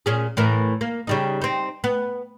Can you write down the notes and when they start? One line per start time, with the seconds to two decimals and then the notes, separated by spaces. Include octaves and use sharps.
0.06 A#2 C#4 G#4
0.37 A2 E3 A#4
0.81 A#3
1.07 C#3 G3 D#4
1.42 C4 D#4
1.84 B3